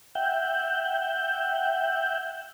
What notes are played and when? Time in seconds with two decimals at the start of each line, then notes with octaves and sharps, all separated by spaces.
0.15 E5 F#5 G5 G6